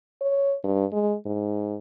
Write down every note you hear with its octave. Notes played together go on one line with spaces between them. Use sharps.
C#5
G2
G#3
G#2